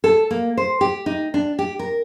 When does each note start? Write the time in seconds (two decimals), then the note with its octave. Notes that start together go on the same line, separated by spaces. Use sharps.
0.04 A4
0.31 A#3
0.57 C5
0.81 G4
1.06 D#4
1.34 D4
1.59 G4
1.79 A#4